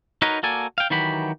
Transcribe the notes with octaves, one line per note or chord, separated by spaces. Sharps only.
D#4 F#4 A#4 B4 C#5 D#5
A#3 F#4 A4 D5 G#5
F5 G5
D#3 E3 F#3 F#4 G4 B5